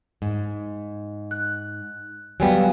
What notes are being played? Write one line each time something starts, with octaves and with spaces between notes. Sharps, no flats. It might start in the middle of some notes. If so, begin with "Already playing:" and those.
G#2
F#6
F#3 G3 B3 F5 G5 G#5